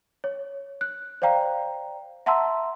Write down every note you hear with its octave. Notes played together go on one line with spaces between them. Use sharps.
C#5
F#6
C5 D5 F5 G5 A#5
E5 F#5 A5 A#5 C6 E6